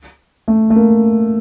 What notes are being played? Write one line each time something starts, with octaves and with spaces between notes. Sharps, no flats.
A3
A3
A#3